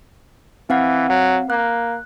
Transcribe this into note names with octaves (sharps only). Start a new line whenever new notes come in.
E3 C4 F5 F#5
F#3
A#3 F#6